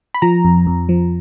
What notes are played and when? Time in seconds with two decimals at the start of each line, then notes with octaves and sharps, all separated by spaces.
0.14 B5
0.22 F3 A#5
0.45 F2
0.67 F2
0.89 F3